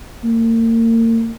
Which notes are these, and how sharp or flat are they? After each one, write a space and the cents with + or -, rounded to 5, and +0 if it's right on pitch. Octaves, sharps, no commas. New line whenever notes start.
A#3 -40